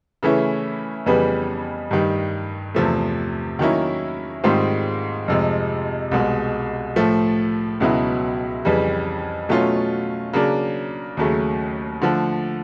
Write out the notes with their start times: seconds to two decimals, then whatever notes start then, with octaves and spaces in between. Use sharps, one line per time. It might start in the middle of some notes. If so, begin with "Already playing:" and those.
0.23 C#3 E3 A3 C#4 E4
1.06 F2 C#3 E3 G3 B3
1.91 G2 D#3 G3
2.74 E2 C3 F3 A3
3.59 D#3 F#3 A#3 C#4 E4
4.44 G#2 D#3 G3 C4 F4
5.28 F2 C3 F3 G#3
6.11 C2 B2 G#3
6.96 A2 F3 A3
7.80 C#2 B2 F#3 B3 E4
8.65 F2 C#3 E3 G3
9.49 B2 F#3 A3 C#4 F4
10.33 C#3 F#3 A#3 D4
11.17 D#2 C#3 F#3 A3
12.02 D3 F3 A3